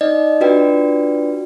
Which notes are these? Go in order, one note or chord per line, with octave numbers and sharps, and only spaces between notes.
D#4 D5 D#5
D4 F4 F#4 B4 D5 G5